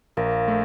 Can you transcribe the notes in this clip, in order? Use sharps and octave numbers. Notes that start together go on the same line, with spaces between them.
A#1 A#3
A3